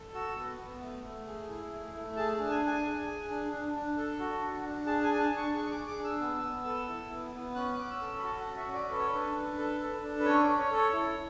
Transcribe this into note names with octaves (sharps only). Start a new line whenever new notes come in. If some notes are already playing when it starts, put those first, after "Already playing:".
Already playing: A4
F#4 E6
B3
B3
A3
A3
G#4
E4
A3
A3
G#4 A5
D4 A5
G#5
D4
G#5
G#4
G#4
D4
D4
D4
A4
F#4
D4
D4
G#4 A5
G#5
D4
G#5
A5
D4 C#6
G#4 C#6
C#6
D6
G#4
D6
D4
E6
B3
B3
A4
E4
B3
B3
C#4 F#6
C#4 D6
E6
A4
B5
F#4 A5
F#5
C#4
E5
C#4
D5
A4 B4
C#5
B4
D4
D4
A4
A4
D4
B4
C#4 C#5
D5
C#4
C#5
A4
C#5
E4